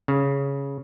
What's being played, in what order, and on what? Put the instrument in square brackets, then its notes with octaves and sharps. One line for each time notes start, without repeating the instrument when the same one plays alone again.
[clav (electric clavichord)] C#3